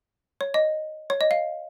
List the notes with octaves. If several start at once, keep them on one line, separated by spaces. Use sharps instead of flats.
C#5
D#5
C#5
D#5
F5